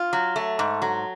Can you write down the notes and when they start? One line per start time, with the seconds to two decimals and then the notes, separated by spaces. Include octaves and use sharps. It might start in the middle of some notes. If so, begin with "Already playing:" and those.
Already playing: F4
0.13 F#3
0.36 A3
0.59 G#2
0.82 F#3